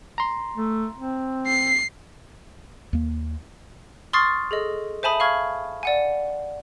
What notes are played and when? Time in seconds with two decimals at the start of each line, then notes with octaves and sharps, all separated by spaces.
0.18 A#5 C6
0.57 A3
0.97 C4
1.47 C7
2.93 D#2 A#3
4.13 C6 C#6 D#6 F6 A6 C7
4.51 G#4 A4 D#5
5.03 C5 E5 G#5 A5 B5 D#6
5.20 F5 B5 C#6 F6 G#6
5.83 D5 F#5 G#5